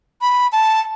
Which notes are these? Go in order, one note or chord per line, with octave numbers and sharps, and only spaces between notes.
B5
A5